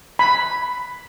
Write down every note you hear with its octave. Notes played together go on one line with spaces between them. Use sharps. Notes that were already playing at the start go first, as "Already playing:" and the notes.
B5